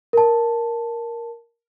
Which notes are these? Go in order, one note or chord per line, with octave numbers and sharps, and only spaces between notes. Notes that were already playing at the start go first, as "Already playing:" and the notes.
A#4 A5